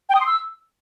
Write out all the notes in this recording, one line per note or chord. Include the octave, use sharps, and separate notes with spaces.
G5
D#6
C6
E6